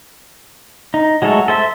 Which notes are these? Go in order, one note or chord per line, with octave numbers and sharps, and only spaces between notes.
D#4
F#3 G#3 A3 A4 C#5
A4 C5 E5